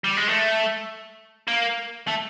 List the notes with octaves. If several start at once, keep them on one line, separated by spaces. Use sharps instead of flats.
G3
G#3
A3
A#3
A3